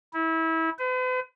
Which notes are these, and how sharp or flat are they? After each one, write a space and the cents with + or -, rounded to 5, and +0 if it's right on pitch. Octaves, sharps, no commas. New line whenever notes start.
E4 -25
B4 +45